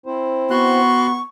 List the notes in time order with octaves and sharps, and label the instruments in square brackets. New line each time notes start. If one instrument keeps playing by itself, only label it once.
[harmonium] C4 E4 C5
[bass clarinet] B3 [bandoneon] F#4 C6 F#6 [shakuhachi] C#6